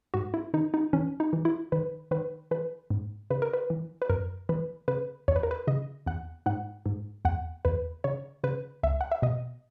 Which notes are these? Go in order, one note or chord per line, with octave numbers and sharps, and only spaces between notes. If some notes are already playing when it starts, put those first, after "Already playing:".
G#2 F#4
E4
D#3 D#4
D#4
E3 C#4
D#4
E3
E4
D#3 B4
D#3 B4
E3 B4
G#2
C#3 B4
A#4
B4
E3
B4
F#2 A#4
E3 B4
C#3 B4
E2 C#5
B4
A#4
B4
C#3 D#5
E2 F#5
G#2 F#5
G#2
E2 F#5
E2 B4
C#3 C#5
C#3 B4
C#2 E5
F#5
E5
B2 D#5